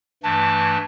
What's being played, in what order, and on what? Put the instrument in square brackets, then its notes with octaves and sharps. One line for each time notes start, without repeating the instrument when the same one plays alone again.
[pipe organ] G2 E3 A3 [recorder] A5